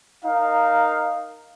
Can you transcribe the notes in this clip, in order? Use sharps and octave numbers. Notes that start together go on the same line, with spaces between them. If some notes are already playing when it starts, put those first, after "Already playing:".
D#4 A#4 F5